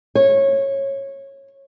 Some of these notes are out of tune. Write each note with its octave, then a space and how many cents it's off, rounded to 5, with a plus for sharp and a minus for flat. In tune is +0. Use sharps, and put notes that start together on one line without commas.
C#5 -20